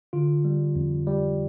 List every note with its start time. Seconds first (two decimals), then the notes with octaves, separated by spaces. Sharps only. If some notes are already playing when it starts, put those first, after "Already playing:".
0.13 D3 F4
0.45 G3
0.76 F2
1.07 G3